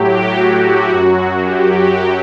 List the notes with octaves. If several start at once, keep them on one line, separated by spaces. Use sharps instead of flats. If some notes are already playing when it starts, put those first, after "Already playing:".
Already playing: A2 F#3 G4
F#4
F#2 F#3
G4